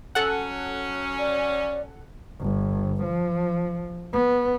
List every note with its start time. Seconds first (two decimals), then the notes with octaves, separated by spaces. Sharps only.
0.15 F#3 C#4 A4 F#5
1.19 D5
2.40 G1
3.03 F3
4.13 B3